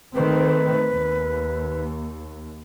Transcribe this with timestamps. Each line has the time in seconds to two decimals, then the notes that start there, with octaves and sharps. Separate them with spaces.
0.15 D#3 A3 C4 B4
0.90 D#2